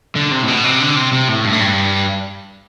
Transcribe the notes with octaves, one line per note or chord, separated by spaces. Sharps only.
D3
C3
A2
B2
C3
D3
C3
C3
A2
G2
A2
G2